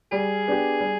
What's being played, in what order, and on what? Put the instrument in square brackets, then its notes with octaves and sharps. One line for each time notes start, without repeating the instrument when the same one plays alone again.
[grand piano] G3 [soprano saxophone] G#4
[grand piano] B3 D4 G4
G3